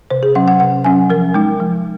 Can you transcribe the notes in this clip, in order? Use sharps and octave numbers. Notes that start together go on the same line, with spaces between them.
C3 C5
G#4
F#3 C#4 F#5
F#5
C3 F#5
F#3 C#4 G#5
F3 A#4
G#3 D#4
F3